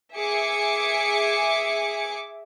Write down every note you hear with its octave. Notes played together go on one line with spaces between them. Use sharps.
G#4 E5 D6 C#7